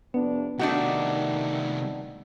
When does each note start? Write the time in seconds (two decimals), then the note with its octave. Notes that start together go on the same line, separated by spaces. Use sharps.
0.14 F2 C3 B3 D4
0.59 C3 D#3 A3 D4 D#4 F#4